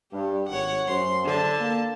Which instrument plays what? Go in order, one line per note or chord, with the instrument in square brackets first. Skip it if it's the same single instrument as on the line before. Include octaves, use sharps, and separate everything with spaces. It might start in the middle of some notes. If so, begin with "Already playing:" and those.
[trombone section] G2 [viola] G4
[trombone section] G#1 [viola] C#5 F#5
[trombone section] F#2 C5 [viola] C6
[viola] D3 A5
[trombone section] A#3